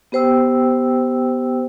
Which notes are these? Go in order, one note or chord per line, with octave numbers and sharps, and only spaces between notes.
B3 G4 C5 G5 E6